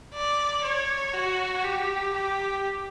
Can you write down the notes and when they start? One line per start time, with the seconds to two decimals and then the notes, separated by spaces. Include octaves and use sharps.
0.14 D5
0.64 C#5
1.14 F#4
1.64 G4
2.14 G4